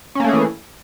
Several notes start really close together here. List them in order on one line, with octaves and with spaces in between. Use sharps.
C#4 A#3 A3 G#4 E3